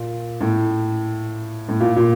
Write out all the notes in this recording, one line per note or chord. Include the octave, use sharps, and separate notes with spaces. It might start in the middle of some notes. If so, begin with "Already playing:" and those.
Already playing: A#2
A2
A2
A#2
A#2